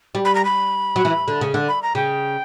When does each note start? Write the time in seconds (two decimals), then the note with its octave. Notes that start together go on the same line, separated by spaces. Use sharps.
0.15 G3
0.25 B5
0.35 A#5
0.45 B5
0.96 F#3
1.05 E3
1.28 D3
1.41 C#3
1.54 D3
1.68 B5
1.83 A#5
1.95 C#3 G5